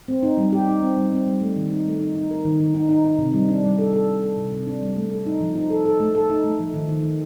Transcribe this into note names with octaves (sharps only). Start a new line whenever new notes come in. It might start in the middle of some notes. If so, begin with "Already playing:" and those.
C4
D#4
G3
G4
D#4
C4
G3
C4
G3
A3
D#3
D#4
A3
D#4
D#4
A#4
D#3
D#3
D#4
D#4
D#4
C3
G3
D4
G3
A4
A4
D4
A4
C3
C3
D4
G3
A3
A4
D#4
F3
D#4
A4
A4
A3
A4
D#4
A3
F3
D#3
D#3
D#3